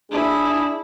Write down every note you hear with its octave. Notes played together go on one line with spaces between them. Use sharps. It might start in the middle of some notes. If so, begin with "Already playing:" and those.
D4 E4 G#4